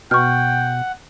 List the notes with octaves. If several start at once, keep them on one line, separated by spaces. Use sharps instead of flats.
B2 F#5 G5 C#6 F6